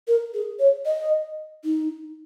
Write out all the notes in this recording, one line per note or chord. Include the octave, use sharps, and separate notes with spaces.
A#4
G#4
C#5
D#5
D#4